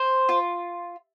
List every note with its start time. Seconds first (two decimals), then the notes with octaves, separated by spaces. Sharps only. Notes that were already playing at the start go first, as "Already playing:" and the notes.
Already playing: C5
0.29 F4